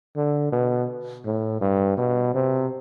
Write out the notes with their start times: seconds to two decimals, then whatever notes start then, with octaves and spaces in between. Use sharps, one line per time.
0.16 D3
0.52 B2
1.26 A2
1.61 G2
1.97 B2
2.34 C3